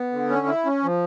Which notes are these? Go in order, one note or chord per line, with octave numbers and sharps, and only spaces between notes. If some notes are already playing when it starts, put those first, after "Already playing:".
Already playing: B3
D3
C#4
E4
C#4
F3